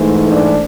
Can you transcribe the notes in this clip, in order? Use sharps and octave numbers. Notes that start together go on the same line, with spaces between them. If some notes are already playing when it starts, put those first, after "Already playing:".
Already playing: G#2 E3 A3
D4